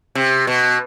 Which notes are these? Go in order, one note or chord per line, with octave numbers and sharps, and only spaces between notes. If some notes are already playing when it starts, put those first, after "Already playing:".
C3
B2